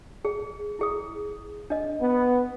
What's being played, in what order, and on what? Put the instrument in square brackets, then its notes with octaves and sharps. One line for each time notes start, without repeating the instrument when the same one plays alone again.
[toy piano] G#4
E4 G#4 D#6
D4 D#5
[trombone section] B3